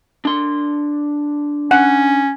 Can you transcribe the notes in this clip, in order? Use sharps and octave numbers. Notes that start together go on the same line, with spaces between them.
D4 C6
C#4 F#5